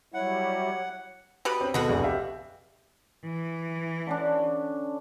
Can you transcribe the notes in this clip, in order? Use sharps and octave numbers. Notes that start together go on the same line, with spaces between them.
F#3 G3 E4 C#5 F#5
B2 G4 B4
C4 C#4 G5
B2 G#3 B3 F#4 A4
F1 A#1
G4 E5 F5
E3
D3 C#4 D4